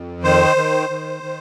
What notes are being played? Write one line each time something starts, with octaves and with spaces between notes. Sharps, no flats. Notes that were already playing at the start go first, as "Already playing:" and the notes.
Already playing: F2
D#3 C5
D#3
D#3
D#3